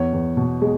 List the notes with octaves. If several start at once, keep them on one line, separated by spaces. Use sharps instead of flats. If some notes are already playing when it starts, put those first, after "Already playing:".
Already playing: E2 C#5
E2
B2
G#3